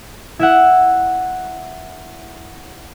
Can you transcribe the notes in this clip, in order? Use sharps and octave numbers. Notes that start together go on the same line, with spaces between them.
E4 E5 F#5